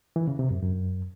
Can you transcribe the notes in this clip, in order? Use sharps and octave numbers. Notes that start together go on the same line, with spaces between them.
E3
C#3
C3
F#2
F#2